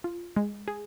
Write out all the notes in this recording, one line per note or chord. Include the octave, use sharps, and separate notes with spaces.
F4
G#3
G#4